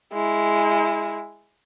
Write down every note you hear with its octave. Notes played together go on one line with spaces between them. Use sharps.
G#3 E4